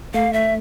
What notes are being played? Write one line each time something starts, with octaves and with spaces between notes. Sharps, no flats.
A3 F5
E5